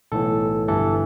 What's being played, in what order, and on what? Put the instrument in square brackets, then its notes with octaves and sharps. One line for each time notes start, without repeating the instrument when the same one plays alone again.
[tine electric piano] B1 A2 E3 A4
G1 G2 E3 A4